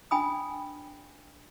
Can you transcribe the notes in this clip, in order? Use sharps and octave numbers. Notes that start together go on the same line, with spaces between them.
D4 G5 G#5 B5 D#6